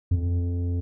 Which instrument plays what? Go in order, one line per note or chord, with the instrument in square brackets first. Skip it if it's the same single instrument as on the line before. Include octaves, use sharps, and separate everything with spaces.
[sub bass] F2